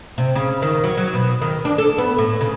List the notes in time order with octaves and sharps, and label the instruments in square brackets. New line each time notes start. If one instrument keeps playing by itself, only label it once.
[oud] C3
C#3
D#3
F#3
F#3
B2
D#3
D4
A4
B3
A2
C#3